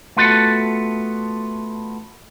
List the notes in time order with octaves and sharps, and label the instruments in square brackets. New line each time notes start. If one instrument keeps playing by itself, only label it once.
[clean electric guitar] A3 B3 F4 F#4 A4